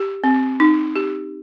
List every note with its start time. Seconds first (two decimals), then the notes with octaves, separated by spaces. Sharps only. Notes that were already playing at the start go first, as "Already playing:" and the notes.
Already playing: G4
0.24 C4
0.60 D#4
0.96 G4